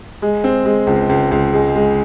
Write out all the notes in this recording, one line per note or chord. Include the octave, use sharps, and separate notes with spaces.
G#3
C4
G#3
C#2
C#2
C#2
G#3
G#3